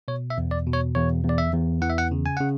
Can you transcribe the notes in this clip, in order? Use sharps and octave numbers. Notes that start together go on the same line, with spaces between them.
B2 C#5
E5
E2
D5
B2
C#5
E2 C#5
E2
D5
E5
E2
E3 F#5
E5
F#5
C#3
G#5
C#3 F#5